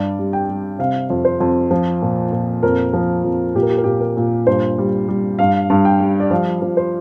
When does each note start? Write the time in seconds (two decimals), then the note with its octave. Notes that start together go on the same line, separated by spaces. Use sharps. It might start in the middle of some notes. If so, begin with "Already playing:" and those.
Already playing: G2 G3 D5
0.19 G3
0.33 G5
0.49 G3
0.79 C3 F5
1.10 F2
1.25 C5
1.41 F2
1.71 F3
2.02 A#2
2.32 A#2
2.63 F2 A#4
2.93 F3
3.24 F2
3.55 A#2 G4
3.62 A#4
3.70 G4
3.78 A#4
3.84 A#2 G4
4.01 A#4
4.17 A#2
4.47 G2 C5
4.78 G3
5.08 G3
5.39 G2 F5
5.70 G2
5.85 G5
6.00 G3
6.20 D5
6.31 F3 F5
6.62 F3
6.77 C5